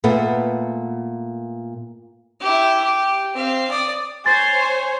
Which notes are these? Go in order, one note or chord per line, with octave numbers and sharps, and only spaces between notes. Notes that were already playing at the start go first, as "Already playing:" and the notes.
A#2 A3 B3
E4 G4
G4
C4 F5
D5 D#6
C5 C#5 G#5 C6 A6